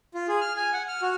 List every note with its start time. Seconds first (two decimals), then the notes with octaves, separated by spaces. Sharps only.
0.14 F4
0.28 G#4
0.41 F6
0.57 G#5
0.73 F#5
0.88 F6
1.02 F#4